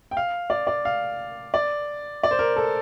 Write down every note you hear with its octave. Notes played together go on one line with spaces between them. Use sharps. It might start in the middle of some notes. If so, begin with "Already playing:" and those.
G5
F5
D5
D5
F5
D5
D5
C5
A#4
A4